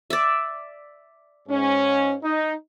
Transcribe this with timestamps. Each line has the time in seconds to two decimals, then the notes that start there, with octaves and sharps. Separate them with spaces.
0.10 D5 E5
1.49 G#2 C#4
2.23 D#4